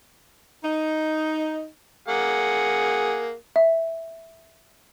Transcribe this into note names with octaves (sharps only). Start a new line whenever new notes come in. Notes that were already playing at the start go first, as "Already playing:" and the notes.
D#4
A#3 G#4 F#5
E5